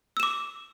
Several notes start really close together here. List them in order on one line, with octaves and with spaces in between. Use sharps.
E6 E7 D6